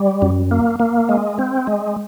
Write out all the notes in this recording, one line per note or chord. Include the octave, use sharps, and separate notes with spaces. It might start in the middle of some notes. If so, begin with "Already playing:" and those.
Already playing: G3
F#2
A#3
A#3
G#3
C4
G#3